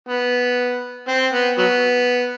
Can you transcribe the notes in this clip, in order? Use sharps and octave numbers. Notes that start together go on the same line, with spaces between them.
B3
C4
B3
F#3 B3